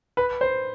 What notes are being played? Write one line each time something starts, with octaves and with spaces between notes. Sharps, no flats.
B4
C5